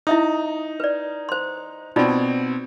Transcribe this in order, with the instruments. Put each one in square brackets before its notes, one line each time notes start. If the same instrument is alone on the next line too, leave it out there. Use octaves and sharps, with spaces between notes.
[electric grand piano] D#4 [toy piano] E4 E5 D#6
[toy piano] B4 D5
C5 C6
[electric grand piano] B2 C4 [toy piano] D#4 F4 D5